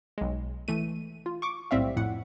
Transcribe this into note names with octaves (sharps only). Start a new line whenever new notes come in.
B1 G#3
E3 A3 D#7
F4
C#6 D6
B1 A2 G3 C4 E5 F5
F2 A2 F#5